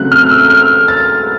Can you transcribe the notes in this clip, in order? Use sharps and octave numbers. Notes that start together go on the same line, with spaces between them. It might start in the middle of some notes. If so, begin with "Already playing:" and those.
Already playing: C#3 F#3 A3 C4 F#6
F6
E6
F6
A6